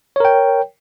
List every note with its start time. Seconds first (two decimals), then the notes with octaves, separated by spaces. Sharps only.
0.16 C#5
0.20 A#4
0.25 G5